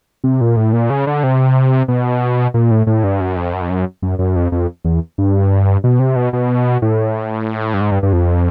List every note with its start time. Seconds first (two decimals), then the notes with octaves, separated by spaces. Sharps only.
0.24 C3
0.41 A#2
0.57 A2
0.73 A#2
0.90 C#3
1.07 D3
1.24 C3
1.88 B2
2.54 A#2
2.71 A2
2.87 A2
3.04 G2
3.21 F#2
3.36 F2
3.53 F#2
3.61 F2
3.70 F#2
4.02 F#2
4.19 F#2
4.36 F2
4.52 F2
4.85 E2
5.18 G2
5.84 B2
5.99 C3
6.16 B2
6.33 B2
6.82 A2
7.74 G2
7.81 G#2
7.91 G2
8.03 G2
8.13 F2